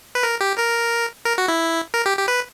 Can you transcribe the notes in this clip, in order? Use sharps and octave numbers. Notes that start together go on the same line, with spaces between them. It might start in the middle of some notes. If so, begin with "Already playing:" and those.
B4
A#4
G4
A#4
A#4
F#4
E4
A#4
G4
G4
B4